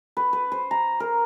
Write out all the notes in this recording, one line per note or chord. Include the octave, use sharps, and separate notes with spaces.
B4
B4
C5
A#5
A#4